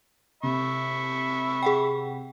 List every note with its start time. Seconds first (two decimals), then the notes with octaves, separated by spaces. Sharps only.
0.43 C3 E5 B5 C#6
1.63 G#4 F#5 G5